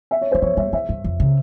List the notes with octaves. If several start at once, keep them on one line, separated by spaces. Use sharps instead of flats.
E5
C#5
E3 C5
F3 C#5
G3 E5
E3 E5
G2
F2
C#3